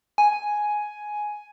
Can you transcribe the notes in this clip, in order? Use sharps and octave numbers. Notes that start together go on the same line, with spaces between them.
G#5